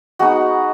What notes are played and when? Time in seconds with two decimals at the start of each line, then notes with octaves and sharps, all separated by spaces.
0.19 G#3 B3 D#4 F#4